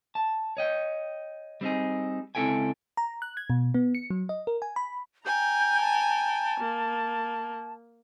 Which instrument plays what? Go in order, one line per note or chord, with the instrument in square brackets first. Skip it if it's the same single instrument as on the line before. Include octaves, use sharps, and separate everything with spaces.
[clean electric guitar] A5
C#5 D#5 G5
G3 C4 D#4 G#4
C#2 C4 E4 A4 G5 G#5
[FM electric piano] A#5
F#6
G#6
B2
B3
C#7
F#3
D#5
A#4
G#5
B5
[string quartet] G5 G#5 A#5 [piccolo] G6
[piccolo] A5
[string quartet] A#3